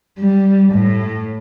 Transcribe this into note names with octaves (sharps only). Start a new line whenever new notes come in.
G3
A2